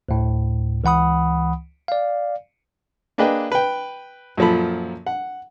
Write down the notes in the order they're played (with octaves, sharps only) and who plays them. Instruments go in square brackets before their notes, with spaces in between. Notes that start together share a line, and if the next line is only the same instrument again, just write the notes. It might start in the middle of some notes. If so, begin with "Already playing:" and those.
[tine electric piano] D2 A2
C#2 E3 F#5 B5 D#6
D5 F5
[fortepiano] A#3 D4 G#4 B4 D#5 G5
B4 G5
F#2 A#2 F3 A4 B5
F#5